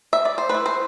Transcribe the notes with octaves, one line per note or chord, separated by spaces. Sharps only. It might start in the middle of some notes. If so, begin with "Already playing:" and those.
E5
D5
C5
A3 E4 B4
C5